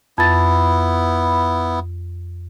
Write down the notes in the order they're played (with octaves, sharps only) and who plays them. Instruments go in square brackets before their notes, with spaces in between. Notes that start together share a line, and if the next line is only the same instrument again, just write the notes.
[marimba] F2 A6 [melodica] B3 E4